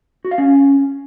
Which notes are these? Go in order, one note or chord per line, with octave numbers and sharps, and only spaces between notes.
F#4
F5
C#4